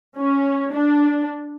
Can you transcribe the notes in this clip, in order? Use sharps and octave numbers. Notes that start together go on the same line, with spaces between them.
C#4
D4